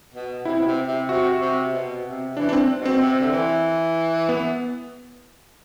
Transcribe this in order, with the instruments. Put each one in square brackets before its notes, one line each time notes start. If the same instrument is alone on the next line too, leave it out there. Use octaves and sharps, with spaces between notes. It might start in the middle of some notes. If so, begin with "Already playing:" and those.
[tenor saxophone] B2
[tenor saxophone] C3 [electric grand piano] E4
[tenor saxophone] B2
C3
C3
[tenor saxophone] C3 [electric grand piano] F#4
[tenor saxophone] C3
B2
C3
[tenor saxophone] E3 [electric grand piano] D4
[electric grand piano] D4
C4
[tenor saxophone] B2
[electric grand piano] C4
[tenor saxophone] C3
D3
E3
[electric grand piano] B3